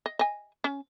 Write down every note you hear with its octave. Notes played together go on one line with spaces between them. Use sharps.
D#5
D#5 G#5
C#4